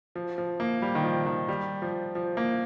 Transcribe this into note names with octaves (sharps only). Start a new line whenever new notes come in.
F3
F3
A#3
G3
D#3
F3
D#3
G3
F3
F3
A#3